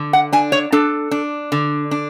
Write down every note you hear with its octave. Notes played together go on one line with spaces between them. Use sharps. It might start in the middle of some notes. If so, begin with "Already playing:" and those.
Already playing: D3
F#5
D4 G#5
C#5
D4 A4
D4
D3
D4